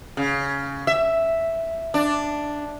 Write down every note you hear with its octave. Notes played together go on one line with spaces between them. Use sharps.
C#3
E5
D4